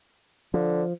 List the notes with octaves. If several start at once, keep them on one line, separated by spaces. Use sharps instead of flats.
D3 F3